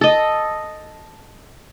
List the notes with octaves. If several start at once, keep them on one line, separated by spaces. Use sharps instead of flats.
A4 D#5